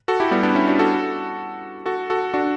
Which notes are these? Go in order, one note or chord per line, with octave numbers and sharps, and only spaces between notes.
F#4 A4
E4 G4
G3 B3
B3 D4
C#4 E4
D4 F#4
F#4 A4
F#4 A4
F#4 A4
D4 F#4